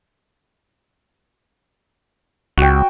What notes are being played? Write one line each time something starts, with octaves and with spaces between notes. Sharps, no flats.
C#2 F#4 G5